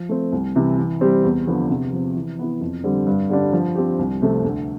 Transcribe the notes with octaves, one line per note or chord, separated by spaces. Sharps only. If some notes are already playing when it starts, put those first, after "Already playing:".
Already playing: F3
A3 C4
C2
C3 E3
E3
G3 C4 G4
E2
D3 F3 B3
C3
F3 C4
E3
B3 E4
F2
D3 G3 C4
G2
D3 G3 D4
F3
C4 G4
C2
C3 F3 A3 C4
D2